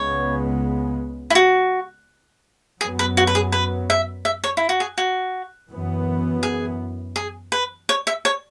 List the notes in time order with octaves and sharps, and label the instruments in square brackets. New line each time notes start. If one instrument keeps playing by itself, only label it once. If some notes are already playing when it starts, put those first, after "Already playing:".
Already playing: [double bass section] C#2 C#3 G#3 B3 [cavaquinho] C#5
[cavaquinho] E4
F#4
[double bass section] F#2 F#3 B3 [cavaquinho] G#4
[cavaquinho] B4
F#4
B4
G#4
B4
E5
E5
C#5
E4
F#4
G#4
F#4
[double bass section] F#2 E3 B3
[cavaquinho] G#4
G#4
B4
C#5
E5
C#5